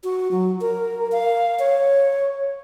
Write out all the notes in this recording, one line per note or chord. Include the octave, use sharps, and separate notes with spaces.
F#4
F#3
A#4
F5
C#5